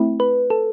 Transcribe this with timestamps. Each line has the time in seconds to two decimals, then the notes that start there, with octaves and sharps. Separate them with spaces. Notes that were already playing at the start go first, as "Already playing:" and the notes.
Already playing: A3 C4 E4
0.20 B4
0.50 A4